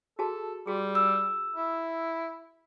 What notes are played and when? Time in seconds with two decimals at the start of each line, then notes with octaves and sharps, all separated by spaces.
0.19 F#4 G#4 A4 A5
0.67 G3 F#4 G#4
0.95 E6
1.56 E4